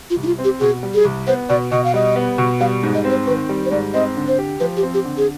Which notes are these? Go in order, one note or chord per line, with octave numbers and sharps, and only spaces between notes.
F4
C2
D#4
F4
C4
G4
B2 G#4
G3
G#4
C2
B3 C5
B2 D5
B2 D#5
F5
G3 D#5
B3
B2
G3 F5
G#2
D#5
C4
C5
D#3 B4
G3
C5
G#2 D5
C4 D#5
D3
C5
G4
F3 B4
G4
C4
G4
D3
G#4